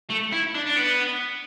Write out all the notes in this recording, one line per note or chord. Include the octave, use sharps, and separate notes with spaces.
A3
E4
D4
D4
B3